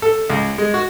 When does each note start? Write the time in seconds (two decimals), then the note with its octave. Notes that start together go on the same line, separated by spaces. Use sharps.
0.02 A4
0.30 C#2
0.58 G#3
0.74 F#4